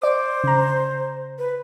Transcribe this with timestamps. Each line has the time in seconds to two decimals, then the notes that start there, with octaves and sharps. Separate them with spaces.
0.02 C5 D5 D6
0.44 C#3 A#5
1.38 B4